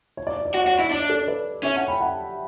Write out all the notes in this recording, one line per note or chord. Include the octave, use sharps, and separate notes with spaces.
C#5
D5
C#5
D5
F#4 C#5
F#4 D5
C#5
E4
D5
D4 C#5
D5
A4 C#5
B4 D5
C#4 C#5 E5
F#5 A5
G5 B5
F#5 A5